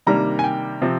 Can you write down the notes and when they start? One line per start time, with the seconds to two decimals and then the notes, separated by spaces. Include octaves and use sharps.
0.06 C3 D#3 G3 A#3 D4 A#5
0.39 G#5
0.44 G5
0.82 C3 F3 C4